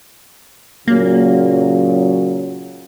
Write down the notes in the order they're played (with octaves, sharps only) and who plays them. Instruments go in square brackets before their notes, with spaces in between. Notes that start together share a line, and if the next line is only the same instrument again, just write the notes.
[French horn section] A#2 C#3 F#3 [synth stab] A#3